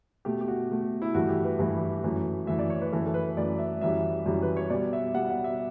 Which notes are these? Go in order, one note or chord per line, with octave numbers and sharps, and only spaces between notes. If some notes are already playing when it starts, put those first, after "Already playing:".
B2 A3 G4
G4
F#4
B2 A3
E4
G2 E3 A3 F#4
G4
B4
G2 E3 A3
F#2 E3 A3
F#2 E3 A3 E5
D5
C#5
B4
F#2 E3 A3 A4
A4
B4
F#2 E3 A3 D5
E5
F#2 E3 G3 E5
F#2 E3 G3
B4
C#5
B2 G3 D5
E5
B2 G3 F#5
F#5
E5